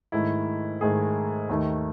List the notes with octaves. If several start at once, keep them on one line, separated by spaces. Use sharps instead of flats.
G#2 D#3 A3 E4
G#2 D#3 A3 G#4
D#2 D#3 A3 D#4